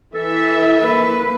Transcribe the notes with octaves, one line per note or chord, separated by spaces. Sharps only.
E3 A4 E5
A#3 B4